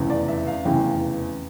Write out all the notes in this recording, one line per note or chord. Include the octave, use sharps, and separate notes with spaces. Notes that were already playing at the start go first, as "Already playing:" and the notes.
Already playing: F1 E2 C#3 E3
D5
E5
F5
F1 E2 C#3 E3 G5